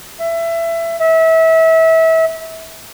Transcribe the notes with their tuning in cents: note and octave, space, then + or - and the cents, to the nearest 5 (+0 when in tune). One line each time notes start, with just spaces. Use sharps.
E5 +20
E5 -25